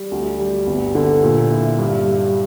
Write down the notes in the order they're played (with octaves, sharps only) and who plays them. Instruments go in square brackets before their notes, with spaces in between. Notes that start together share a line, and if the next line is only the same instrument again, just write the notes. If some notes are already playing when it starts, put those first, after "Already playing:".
Already playing: [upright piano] G3
D2
G3
G1
D3
A#2
E4
G2
G3